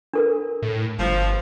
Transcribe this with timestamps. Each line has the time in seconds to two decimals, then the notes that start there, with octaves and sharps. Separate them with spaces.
0.13 D4 A4 A#4
0.62 A2
0.99 G1 F3